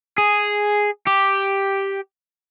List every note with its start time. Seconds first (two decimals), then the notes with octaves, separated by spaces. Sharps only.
0.18 G#4
1.07 G4